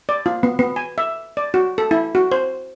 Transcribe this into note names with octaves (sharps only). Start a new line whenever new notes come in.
D5
F4
B3
B3
G#5
E5
D5
F#4
A4
E4
F#4
C5